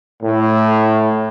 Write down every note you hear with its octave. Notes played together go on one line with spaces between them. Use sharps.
A2